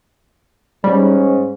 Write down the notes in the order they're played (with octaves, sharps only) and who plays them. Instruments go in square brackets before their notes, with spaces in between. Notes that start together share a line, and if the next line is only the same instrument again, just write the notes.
[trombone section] G#2 C#4 [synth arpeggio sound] G3